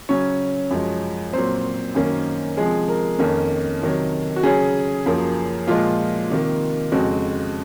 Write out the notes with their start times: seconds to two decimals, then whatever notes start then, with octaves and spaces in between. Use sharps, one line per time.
0.09 C#3 F#3 C#4 C#5
0.71 F#2 F3 G#3
1.33 A#2 F#3 C4 C5
1.95 F#2 D#3 A#3 C#4
2.57 C3 F3 G#3 G#4
2.88 A#4
3.19 F2 D#3 A#3 C#4
3.82 C3 D#3 F#3
4.36 F#4
4.43 C#3 F#3 C#4 G#4
5.06 F#2 F3 A#3
5.67 A#2 F3 G#3 F4
6.30 C3 D#3 A#3
6.92 F2 C#3 G#3 C4 F#4